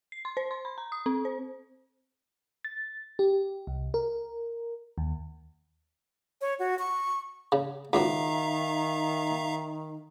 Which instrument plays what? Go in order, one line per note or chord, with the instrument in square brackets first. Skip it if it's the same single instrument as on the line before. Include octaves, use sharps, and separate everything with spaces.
[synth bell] C7
C6
C5
C6
B5
A#5
D#6
C4
C5
[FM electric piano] A6
G4
C2
A#4
D#2
[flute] C#5
F#4
C#6
[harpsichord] C#3
[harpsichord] C#2 B2 [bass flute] D#3 [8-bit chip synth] E5 F5 A#5